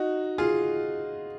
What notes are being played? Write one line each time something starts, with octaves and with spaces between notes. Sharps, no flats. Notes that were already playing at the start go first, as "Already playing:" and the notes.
Already playing: D#4 F#4
F4 G#4